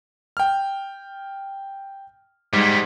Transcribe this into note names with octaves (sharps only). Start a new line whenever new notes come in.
G5 F6
G#2 G3 G#3